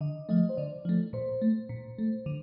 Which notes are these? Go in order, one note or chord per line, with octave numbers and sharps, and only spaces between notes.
D3 D#5
F3 A3 D#5
C5
D3 D5
F3 A3
A#2 C5
A3
A#2
A3
D3